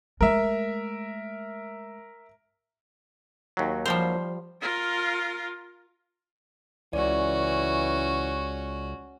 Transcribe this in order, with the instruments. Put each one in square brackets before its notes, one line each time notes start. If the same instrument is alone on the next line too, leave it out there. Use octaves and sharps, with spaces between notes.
[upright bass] G#3 A3 [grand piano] A#4 E5
[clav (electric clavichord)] D#2 F#3
[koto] F3 G3 C5
[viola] F4 A#4
[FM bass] C#2 [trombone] E3 [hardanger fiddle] C#4 F#4 [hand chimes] D5